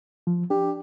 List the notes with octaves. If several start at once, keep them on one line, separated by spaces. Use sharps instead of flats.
F3
D4 G4